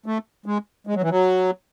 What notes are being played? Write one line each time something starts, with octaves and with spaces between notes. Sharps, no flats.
A3
G#3
G#3
F#3
E3
F#3